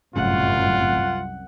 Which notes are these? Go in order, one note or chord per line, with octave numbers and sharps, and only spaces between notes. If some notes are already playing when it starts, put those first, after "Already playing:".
G1 C2 F#2 A2 C#3 F4 F#5